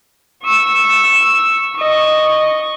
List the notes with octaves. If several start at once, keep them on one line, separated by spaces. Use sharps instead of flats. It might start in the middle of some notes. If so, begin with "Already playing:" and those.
C#6 E6
D#5 C#6